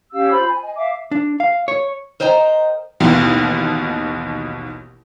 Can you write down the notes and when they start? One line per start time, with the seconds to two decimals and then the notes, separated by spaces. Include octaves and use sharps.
0.12 C#4 G4 F5 E6
0.31 F4 C5 B5
0.49 G#5
0.62 D#5 G#5
0.76 E5 F5 D6
1.11 D4
1.40 F5
1.68 C#5
2.20 A#4 C5 D#5 G5 A5 A#5
3.00 A1 D#2 B2